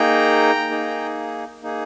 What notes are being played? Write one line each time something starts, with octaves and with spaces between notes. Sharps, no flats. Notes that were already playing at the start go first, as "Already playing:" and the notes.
Already playing: A#3 D#4 G#4 G5 A#5
A#3 D#4 G#4
A#3 D#4 G#4